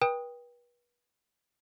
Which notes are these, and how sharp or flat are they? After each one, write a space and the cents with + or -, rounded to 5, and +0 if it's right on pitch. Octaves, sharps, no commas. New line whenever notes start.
B4 -35 G5 +15 D#6 +0